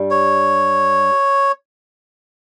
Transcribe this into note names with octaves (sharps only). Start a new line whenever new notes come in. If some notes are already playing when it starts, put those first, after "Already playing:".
Already playing: G2 G3
C#5